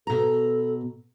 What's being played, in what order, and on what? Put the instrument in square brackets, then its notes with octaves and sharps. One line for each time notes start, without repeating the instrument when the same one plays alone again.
[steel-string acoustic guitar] B2 A#5 [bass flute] A4